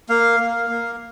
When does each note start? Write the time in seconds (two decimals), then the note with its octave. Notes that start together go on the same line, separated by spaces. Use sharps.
0.09 A#3 F5
0.40 A#3
0.70 A#3